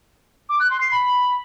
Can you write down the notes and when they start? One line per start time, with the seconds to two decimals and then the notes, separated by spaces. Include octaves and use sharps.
0.49 D6
0.60 F#6
0.70 C6
0.81 C7
0.92 B5